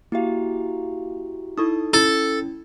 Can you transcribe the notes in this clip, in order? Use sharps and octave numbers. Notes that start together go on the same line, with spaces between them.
A#3 E4 F#4 G4 F5
D#4 E4 A4 C#6 D#6
C#4 E4 A4